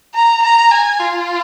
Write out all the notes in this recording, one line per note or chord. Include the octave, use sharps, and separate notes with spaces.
A#5
A#5
G#5
F4